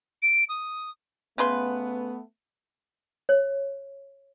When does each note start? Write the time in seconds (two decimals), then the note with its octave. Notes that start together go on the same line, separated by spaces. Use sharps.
0.22 D7
0.49 D#6
1.38 C#3 A3 B3 B4 C6
3.29 C#5